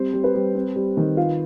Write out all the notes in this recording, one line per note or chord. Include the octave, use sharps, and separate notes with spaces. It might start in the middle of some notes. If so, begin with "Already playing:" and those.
Already playing: G3 C4 C5
G3
B4
G3
C4
G3
D#3
F4